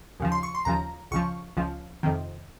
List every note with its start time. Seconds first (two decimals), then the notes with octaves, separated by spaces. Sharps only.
0.20 D#2 C#3 F3
0.32 C6
0.43 C#6
0.55 C6
0.65 D#2 C#3 F3 A#5
1.11 C#2 C#3 F3 C#6
1.57 C#2 C#3 F3
2.03 F2 C3 D#3